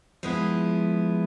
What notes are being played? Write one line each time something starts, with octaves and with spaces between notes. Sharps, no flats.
F3 G#3 B3 E4